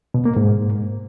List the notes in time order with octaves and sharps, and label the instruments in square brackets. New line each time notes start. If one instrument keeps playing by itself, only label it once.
[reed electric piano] B2
A#3
G#2